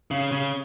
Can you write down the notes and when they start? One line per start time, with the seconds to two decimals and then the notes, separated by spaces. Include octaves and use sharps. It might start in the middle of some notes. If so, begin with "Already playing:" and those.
0.11 C#3
0.32 C#3